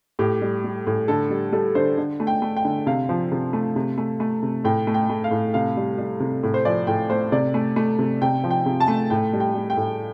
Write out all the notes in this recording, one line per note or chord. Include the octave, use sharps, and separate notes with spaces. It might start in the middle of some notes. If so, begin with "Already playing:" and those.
A2 G4
G3
G3
A2
D3 A4
G3
G3 A4
D3 C5
D3
A3
G5
A3
G5
D3
C3 F5
F3
C3
A3
C3
A3
A3
C3
A2 G5
A3
G5
A3
F5
A2
C3 F5
G3
G3
C3
A2
C5
F3 D5
A2 G5
A3 C5
C3 D5
A3
A3
C3
C3 G5
F3
G5
C3
A5
A3
A2 G5
G3
G5
G3
G5
A2